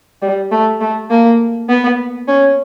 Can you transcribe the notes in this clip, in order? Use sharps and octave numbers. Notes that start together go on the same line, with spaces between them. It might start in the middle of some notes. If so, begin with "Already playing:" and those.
G3
A3
A3
A#3
B3
C#4